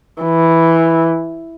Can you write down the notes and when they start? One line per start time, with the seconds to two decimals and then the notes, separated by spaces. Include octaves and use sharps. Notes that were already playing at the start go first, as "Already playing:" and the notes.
0.22 E3